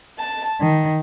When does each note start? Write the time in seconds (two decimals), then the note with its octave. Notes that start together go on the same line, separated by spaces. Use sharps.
0.18 A5
0.59 D#3